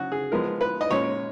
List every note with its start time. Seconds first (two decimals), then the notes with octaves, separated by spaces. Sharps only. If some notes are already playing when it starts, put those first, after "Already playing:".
Already playing: C#3 F#3 C#4 F#4
0.12 G#4
0.32 F3 G#3 B3 A#4
0.61 B4
0.81 D#5
0.91 A#2 G#3 C#4 C#5